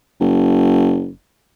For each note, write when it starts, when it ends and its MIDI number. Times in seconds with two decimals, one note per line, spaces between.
0.20 1.12 30